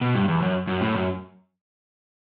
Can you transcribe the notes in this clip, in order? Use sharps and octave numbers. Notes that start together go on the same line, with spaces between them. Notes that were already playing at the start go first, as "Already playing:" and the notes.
B2
G2
E2
F#2
F#2
A2
F#2